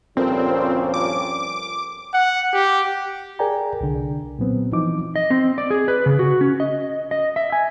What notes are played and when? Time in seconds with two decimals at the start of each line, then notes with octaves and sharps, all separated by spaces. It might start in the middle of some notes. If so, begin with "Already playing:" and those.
0.17 D2 G2 A#2 F3 G3 C4 C#4
0.94 D6
2.13 F#5
2.53 G4
3.39 G#4 A#4 D5 G5 G#5 A#5
3.81 C2 D3
4.39 A#2 F#3 B3 C4
4.72 E3 F3 D#4 D6
5.16 D#5
5.30 C4
5.58 D5
5.71 G#4
5.88 B4
6.06 C#3
6.19 F#4
6.41 C#4
6.60 D#5
7.11 D#5
7.36 E5
7.52 G#5